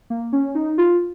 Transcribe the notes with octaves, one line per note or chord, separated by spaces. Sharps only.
A#3
C#4
D#4
F4